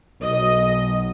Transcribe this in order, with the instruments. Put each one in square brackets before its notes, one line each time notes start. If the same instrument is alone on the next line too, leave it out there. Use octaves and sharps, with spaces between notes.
[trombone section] B1 [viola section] D#5